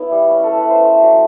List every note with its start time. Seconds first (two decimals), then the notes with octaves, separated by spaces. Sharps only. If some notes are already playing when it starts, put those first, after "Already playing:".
Already playing: B3 E4
0.11 G3
0.30 C#4
0.43 A3 A4
0.57 B4
0.66 C#4 C5
0.84 A3
1.02 F#3